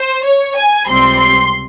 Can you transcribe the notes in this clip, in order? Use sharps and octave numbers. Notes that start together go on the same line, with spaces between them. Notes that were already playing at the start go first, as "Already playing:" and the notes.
Already playing: C5
C#5
G#5
C#2 C3 G3 C4 C6
C6